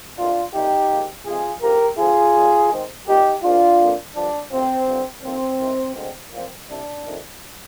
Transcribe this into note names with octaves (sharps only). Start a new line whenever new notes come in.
D2 C3 D#3 A#3 D4 F4
F2 C3 G3 A#3 D#4 G4
G#2 F3 A#3
F2 C3 F3 G#3 C4 F4 G#4
D2 D3 F3 C4 G4 A#4
F2 D3 F3 C4 F4 G#4
D#2 D#3 G3 A#3
G#2 D#3 G#3 C4
A#2 G3 C4 D#4 G4
G#2 G3 A#3 D4 F4
F2 D3 F3 A#3
G2 D3 F3 D4
D2 C3 F3 C4
G2 D3 F3
F2 D#3 A#3 C4
C2 C3 D#3
D2 D3 G#3 C4
A#2 F3 C4
C2 C3 G3 D4
F2 C3 D#3